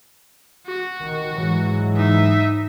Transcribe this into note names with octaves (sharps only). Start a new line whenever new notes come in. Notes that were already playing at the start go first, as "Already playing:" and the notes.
F#4
D#3
G#2 E3 F#3
D#4 E5